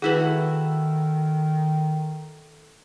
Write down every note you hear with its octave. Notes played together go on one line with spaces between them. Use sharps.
D#3 A3 E4 F#4 G#4 B4